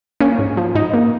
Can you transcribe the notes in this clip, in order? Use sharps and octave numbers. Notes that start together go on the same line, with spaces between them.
A#3 C#4
G#2
F3
G#2 D#4
A#3